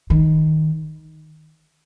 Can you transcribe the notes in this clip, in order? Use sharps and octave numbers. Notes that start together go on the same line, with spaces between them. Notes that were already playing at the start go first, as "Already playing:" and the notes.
D#3